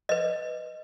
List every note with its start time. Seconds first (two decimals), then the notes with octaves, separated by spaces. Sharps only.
0.09 B4 D#5